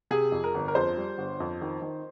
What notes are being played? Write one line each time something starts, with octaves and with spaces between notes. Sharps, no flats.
C3 G#4
F2
A#4
G1
A#4
F2 C5
G3
G1
F2
D#3
D#3